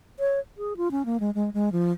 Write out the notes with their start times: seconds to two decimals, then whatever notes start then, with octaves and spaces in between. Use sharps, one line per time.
0.20 C#5
0.58 G#4
0.77 F4
0.91 C#4
1.05 A#3
1.20 G#3
1.35 G#3
1.54 G#3
1.72 F3